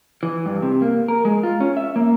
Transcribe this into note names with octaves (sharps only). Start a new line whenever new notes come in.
E3
G2
C3
A#3
A#4
G#3
F4
C#4
E5
A#3